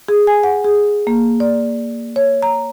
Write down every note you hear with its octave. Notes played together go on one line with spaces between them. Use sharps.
G#4
G#5
F#5
G#4
A#3
D5
C#5
A#5